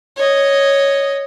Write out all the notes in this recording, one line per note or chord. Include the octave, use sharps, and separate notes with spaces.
C#5 D#5